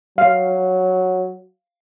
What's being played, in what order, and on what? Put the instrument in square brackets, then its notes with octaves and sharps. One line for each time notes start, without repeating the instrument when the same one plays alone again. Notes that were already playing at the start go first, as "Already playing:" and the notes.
[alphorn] F#3 [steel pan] F5